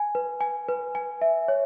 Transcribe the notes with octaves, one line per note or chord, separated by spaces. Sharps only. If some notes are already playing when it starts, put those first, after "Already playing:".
Already playing: G#5
B4
G#5
B4
G#5
E5
C#5